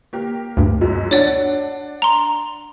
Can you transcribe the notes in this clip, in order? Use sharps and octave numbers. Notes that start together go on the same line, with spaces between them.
A#3 G4
D2 G2
F#2 F#3 G#3
D4 C#5 D5 F#5
A#5 C6